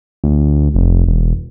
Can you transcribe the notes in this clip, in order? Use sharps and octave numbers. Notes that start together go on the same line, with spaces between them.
D2
F1
E1